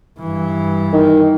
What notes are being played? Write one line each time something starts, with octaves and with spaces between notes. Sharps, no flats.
G2 E3
D#3